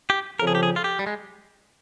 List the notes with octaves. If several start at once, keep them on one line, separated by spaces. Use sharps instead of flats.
G4
F2 C#3 F3 A#4
G#4
G4
G#4
F4
G4
G3
G#3